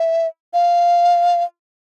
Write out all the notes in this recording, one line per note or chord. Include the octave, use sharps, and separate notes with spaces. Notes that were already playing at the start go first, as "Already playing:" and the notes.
Already playing: E5
F5